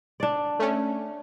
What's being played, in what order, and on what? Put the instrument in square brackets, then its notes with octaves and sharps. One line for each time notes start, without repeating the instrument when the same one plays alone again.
[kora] D4 D5
[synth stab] A3 C#4